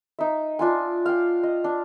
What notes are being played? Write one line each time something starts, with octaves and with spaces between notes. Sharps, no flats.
D#4 E5
D4 F4 G#5
F5 G5
D#5
D4